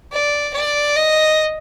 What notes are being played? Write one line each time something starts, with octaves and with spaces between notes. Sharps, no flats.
D5
D5
D#5